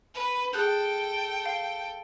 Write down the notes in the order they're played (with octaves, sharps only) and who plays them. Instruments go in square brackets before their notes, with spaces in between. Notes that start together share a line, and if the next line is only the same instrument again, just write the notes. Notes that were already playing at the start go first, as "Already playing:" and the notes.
[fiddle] B4
[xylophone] G#4 F#6 G6 [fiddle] A4 G5
[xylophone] F5